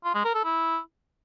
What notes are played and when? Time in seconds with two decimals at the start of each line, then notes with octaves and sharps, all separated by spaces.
0.04 F4
0.14 G#3
0.24 A#4
0.34 A4
0.44 E4